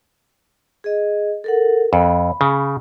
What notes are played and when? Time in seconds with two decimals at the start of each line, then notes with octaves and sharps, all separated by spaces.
0.84 G#4 D#5
1.44 A4 A#4 F#5
1.93 F2 B5
2.41 C#3